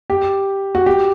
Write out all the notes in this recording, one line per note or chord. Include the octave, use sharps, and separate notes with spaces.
G4
F#4
G4